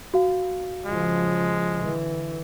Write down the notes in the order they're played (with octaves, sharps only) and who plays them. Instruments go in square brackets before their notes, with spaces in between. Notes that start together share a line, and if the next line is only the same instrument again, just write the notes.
[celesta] F#4 F5
[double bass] C#3 F3 [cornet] G#3
[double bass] D3 E3